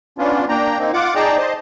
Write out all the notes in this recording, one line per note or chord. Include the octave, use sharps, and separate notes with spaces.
B3 C#4 D4 F4
A#3 D4 G5 A#5
A#3 C4 D#4
F4 F#5 D6
D#4 G#4 D5 G5 A5 A#5
C5 D#5 A5